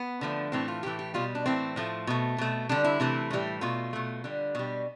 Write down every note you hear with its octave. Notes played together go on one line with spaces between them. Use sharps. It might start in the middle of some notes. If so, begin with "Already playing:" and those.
Already playing: B3
D3 F3 A3
A2 E3 A3 C4
F4
A2 E3 A3 G4
G4
B2 G3 F4
D4
A2 E3 A3 C4
A2 F3 A3
B2 A3
B2 A3
D3 G3 D4
E4
C3 E3 A3
A2 E3 G3
B2 A3 F4
B2 A3
D3 G3
B2 G3